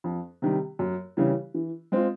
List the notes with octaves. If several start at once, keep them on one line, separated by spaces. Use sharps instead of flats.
F2
C3 D#3 G3
F#2
C#3 E3 G3
E3
G#3 C4 F4